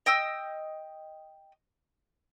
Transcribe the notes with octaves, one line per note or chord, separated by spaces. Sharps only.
D#5 G5 D#6 E6